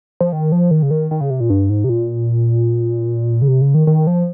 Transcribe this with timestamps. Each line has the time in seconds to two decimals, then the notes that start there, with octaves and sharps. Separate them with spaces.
0.21 F3
0.32 D#3
0.52 F3
0.71 D#3
0.83 C#3
0.91 D#3
1.11 D#3
1.21 C#3
1.30 C3
1.40 A#2
1.50 G2
1.70 G#2
1.84 C3
1.89 A#2
3.42 C#3
3.48 C3
3.61 C#3
3.74 D#3
3.87 D#3
4.07 F3